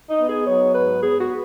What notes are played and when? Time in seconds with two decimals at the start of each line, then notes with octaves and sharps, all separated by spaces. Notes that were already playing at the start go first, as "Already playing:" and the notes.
0.10 D#4
0.20 B3
0.29 G#4
0.47 F#3 C#5
0.75 G#2 B4
1.03 B3 G#4
1.21 F#4
1.30 B3